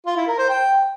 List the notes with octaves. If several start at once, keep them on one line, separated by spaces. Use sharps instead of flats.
F4
E4
A#4
C5
G5